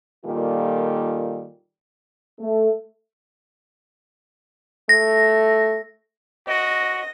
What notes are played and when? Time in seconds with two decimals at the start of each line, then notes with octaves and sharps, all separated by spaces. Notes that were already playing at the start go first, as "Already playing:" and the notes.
0.24 A#2 D#3 G3 F4 A4
2.40 A3
4.89 A3 A#6
6.47 F#4 D#5 A#6